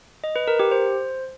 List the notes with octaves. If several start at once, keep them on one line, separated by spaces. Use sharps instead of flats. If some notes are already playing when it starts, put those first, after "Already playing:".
D#5
B4
A#4
G4
C5